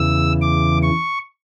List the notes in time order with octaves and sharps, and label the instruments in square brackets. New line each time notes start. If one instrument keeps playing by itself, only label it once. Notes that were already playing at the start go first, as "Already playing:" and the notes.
Already playing: [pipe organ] E2 C#3 E3 E6
D6
C#6